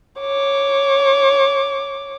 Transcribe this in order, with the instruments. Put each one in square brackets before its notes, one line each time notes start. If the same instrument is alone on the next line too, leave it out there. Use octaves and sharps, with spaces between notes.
[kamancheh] C#5 D6